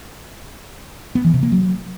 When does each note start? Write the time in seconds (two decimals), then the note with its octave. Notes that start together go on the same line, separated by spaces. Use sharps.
1.15 B3
1.24 E3
1.34 C3
1.43 A#3
1.52 F#3